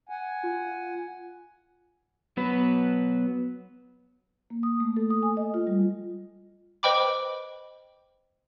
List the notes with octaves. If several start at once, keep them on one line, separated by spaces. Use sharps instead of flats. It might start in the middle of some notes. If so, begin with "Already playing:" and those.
F#5 G#5
F4
F#3 B3 F#4 B4
A#3
D#6
A3
A4
D#6
G#5
D#5
F4
G3
B4 C5 D#5 G5 B5 D6